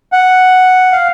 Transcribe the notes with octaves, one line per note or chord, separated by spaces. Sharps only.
F#5
F5